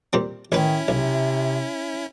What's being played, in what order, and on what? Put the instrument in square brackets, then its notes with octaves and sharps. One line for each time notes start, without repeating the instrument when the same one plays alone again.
[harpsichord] A#2 G3 C4
[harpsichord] A1 B4 [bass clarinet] D#3 [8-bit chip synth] C#4 E4
[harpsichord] B1 [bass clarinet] C3